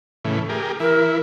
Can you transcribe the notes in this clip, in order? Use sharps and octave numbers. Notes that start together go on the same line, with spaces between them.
A2 C#3 E3
G4 G#4 A#4
E3 E4 A#4